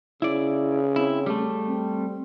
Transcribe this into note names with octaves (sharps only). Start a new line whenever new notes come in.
C#3 E4 D5
C4 E4
G3 A3
C4